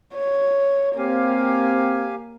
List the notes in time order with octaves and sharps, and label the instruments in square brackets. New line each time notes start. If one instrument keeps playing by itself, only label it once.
[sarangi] C#5
[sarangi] A#3 [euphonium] C4 [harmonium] G4 F5 G#5